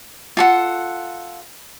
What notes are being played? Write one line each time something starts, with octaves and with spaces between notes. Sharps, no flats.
F4 A4 F#5